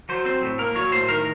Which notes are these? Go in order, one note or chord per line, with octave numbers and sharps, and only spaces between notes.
F#3 C5
C4 C5
A2
A#3 A#4
F#3 C#5
A2 C5
D#3 A#4